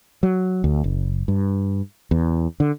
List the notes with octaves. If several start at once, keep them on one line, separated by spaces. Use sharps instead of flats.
F#3
D2
F#1
G2
E2
D3